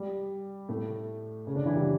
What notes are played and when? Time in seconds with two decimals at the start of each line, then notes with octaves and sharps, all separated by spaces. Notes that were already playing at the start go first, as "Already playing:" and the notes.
Already playing: G3
0.69 A2 A3
1.47 C#3 C#4
1.56 D3 D4
1.65 E3 E4
1.75 G3 G4